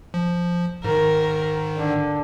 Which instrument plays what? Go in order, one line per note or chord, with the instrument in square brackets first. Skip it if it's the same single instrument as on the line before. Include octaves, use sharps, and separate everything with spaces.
[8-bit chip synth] F3
[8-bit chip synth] G#2 D#3 [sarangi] A#4
[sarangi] D3